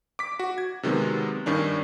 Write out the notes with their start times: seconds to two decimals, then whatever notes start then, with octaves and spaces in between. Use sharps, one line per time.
0.19 D6 B6
0.39 F#4
0.58 G#6
0.83 C3 D#3 F#3 G#3 B3
1.46 G2 D#3 C#4 D4